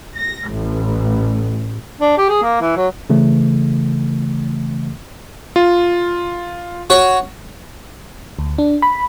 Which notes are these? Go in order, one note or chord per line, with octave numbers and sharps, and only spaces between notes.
A#6
A1
D4
G4
G#4
A#3
E3
F#3
C#3 E3 A3
F4
F#4 C#5
D2
D4
B5